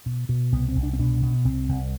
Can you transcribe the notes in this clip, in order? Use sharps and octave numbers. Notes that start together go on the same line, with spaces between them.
B2
B2
C2 B3
C4
C2
D4
C4
B2 D4
B2
C2 C4
C2